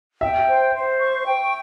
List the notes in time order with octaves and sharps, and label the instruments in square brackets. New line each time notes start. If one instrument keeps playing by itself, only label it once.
[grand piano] E5 [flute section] G5
[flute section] C5
C5
C#6
G5